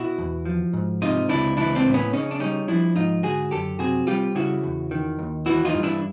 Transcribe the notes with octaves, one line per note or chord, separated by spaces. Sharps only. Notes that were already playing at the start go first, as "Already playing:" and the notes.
Already playing: B2 E4 F#4
E2
F3
G#2
C3 D#4 F4
C#2 D4 E4
E3 D4 E4
C4 D4
A2
B3 C#4
C#3 C#4 D#4
D4
G3 C#4 D#4
F3 D4 E4
G#2 D#4 F4
D3 F#4 G#4
F#2 G4 A4
C3 F#4 G#4
G3 F4 G4
C#3 E4 F#4
E2
D#3
D#2
E3 E4 F#4
D#4 F4
G2
D4 E4